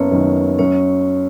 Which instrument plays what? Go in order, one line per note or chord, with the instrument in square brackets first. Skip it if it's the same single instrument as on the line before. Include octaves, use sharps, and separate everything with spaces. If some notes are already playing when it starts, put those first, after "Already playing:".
Already playing: [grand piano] F#1 [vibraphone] B3 C#4 B4 C#5
[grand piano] F#2 D#3
[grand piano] F#2 [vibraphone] C#4 C#5